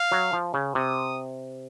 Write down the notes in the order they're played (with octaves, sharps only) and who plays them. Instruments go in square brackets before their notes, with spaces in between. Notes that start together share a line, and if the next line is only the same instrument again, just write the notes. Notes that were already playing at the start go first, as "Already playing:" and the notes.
Already playing: [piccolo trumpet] F5
[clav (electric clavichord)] F#3
F3
C#3
[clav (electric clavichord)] C3 [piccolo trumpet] D#6